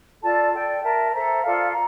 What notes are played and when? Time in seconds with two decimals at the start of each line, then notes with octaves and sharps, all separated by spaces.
0.22 F4 A4 D5 A5
0.53 A4 D5 G5
0.83 A#4 E5 A5
1.13 A4 C5 E5 A#5
1.43 F4 A4 D5 F5
1.72 A#5